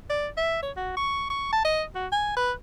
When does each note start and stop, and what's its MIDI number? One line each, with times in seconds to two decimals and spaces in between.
0.10 0.28 74
0.37 0.61 76
0.63 0.71 73
0.76 0.95 66
0.97 1.27 85
1.30 1.49 85
1.53 1.63 81
1.65 1.83 75
1.95 2.07 66
2.12 2.35 80
2.37 2.52 71